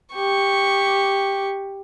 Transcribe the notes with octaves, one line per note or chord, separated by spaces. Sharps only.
G4 C#6